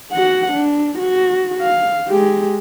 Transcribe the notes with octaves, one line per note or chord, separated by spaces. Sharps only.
F#4 F#5
D4
F#4
F5
G#3 G4